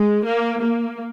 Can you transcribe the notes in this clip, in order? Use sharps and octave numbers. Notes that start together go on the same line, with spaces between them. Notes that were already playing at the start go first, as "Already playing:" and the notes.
Already playing: G#3
A#3
A#3